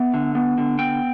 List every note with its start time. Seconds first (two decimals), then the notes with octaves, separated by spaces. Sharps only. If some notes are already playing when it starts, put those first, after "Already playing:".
Already playing: B3 E5
0.14 D3
0.35 B3
0.58 D3
0.79 B3 G5